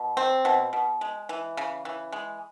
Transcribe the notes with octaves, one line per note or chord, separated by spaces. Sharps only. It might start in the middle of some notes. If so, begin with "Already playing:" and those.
Already playing: B2
C4
B2
B2
G#3
E3
C#3
E3
G#3